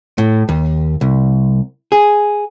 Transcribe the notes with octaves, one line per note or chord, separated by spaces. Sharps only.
A2
D#2
C2
G#4